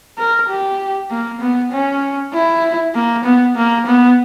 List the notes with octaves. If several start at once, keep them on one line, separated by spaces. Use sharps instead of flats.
A#4
G4
A#3
B3
C#4
E4
A#3
B3
A#3
B3